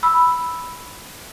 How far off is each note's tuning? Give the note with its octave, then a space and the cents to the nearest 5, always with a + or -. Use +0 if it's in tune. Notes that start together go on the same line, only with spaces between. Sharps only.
B5 +0 E6 +0